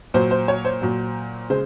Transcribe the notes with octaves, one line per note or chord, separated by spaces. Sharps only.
A#2 F#3 C5
C5
C#5
C5
A#2 F#3
C#3 G#3 C5